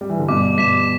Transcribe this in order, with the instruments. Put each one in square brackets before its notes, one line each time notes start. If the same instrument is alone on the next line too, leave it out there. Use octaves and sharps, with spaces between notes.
[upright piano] G3
E3
D3
[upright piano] G2 B2 [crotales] D6
[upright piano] G2 B2 [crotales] B6 E7